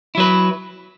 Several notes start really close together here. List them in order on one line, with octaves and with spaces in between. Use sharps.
E4 F#3 B4